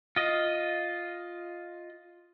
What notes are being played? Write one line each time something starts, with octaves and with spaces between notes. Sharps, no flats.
F4 D#5